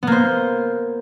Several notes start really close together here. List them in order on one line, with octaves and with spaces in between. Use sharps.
B3 A#3 C5